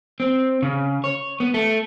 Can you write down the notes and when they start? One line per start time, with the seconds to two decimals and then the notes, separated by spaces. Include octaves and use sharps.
0.20 C4
0.62 C#3
1.04 C#5
1.40 B3
1.54 A3